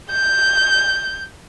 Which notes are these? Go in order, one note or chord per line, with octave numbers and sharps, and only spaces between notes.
G6